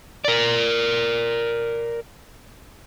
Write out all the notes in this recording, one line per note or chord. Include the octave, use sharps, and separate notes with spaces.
A#4 D5